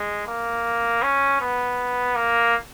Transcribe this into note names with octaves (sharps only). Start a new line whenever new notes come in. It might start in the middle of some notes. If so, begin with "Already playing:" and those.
Already playing: G#3
A#3
C#4
B3
A#3